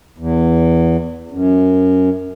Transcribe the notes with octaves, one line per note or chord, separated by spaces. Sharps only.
E2
F#2